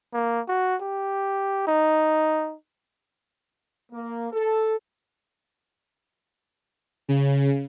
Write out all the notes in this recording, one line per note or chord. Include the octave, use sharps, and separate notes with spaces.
A#3
F#4
G4
D#4
A#3
A4
C#3